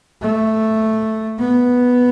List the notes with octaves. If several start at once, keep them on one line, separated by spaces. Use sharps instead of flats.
A3
B3